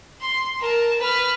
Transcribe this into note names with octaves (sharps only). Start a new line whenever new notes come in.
C6
A#4 A5
B4 F6